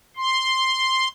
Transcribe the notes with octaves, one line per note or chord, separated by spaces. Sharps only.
C6